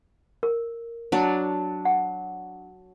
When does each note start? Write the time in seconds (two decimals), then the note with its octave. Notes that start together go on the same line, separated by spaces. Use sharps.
0.43 A#4
1.12 F#3 D4
1.85 F#5